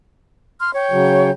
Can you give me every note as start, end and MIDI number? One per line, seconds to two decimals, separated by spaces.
0.60 0.73 84
0.60 0.73 89
0.75 1.31 73
0.75 1.31 79
0.91 1.30 49
0.91 1.30 54